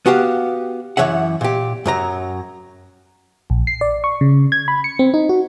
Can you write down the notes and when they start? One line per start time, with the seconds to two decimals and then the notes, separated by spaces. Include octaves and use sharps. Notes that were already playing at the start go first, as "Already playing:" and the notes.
0.06 B3 F#4 G4 F5
0.97 F#2 E3 C#5 E5 F#5
1.41 A#2 G4
1.86 F#2 F#3 A#5
3.50 A#1
3.67 C7
3.81 D5
4.04 C#6
4.21 C#3
4.52 G#6
4.68 B5
4.84 C#7
4.99 C4
5.14 D#4
5.29 F#4